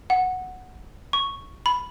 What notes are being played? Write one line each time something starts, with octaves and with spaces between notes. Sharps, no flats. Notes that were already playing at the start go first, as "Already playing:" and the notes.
F#5
C#6
B5